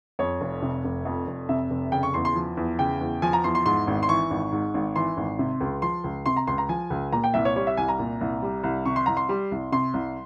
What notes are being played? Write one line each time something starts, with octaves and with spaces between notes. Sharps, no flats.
F2 C#5
F1
C3
F1
F2
F1
C3 E5
F1
C#3 G5
C#6
E2 C6
C6
F3
E2
C#3 G5
E2
F3 G#5
A#5
E2 C6
C6
G#2 C6
G#1
C6
E3 C#6
G#1
G#2
G#1
E3 C6
G#1
C3
C#2
F3 C6
C#2
C3 C6
A#5
C#2 C6
A#5
F3 G#5
C#2
A#2 A#5
G5
C2 E5
C#5
G3 C#5
E5
C2 G#5
A#5
A#2
C2
G3
C2
C3 C#6
C6
C2 A#5
C6
G3
C2
C3 C6
C2